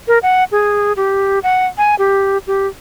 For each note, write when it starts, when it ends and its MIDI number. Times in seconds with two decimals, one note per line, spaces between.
0.08 0.18 70
0.23 0.44 78
0.52 0.93 68
0.96 1.39 67
1.43 1.66 78
1.78 1.95 80
1.99 2.38 67
2.47 2.67 67